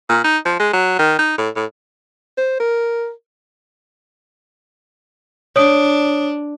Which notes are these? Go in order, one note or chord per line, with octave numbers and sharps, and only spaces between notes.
A#2
D#4
F3
G#3
F#3
D#3
D#4
A2
A2
C5
A#4
D4 C#5 D#6 D7